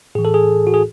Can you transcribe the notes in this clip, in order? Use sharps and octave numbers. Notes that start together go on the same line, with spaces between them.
A2 E3 G#4
A4
G#4
F#4
G#4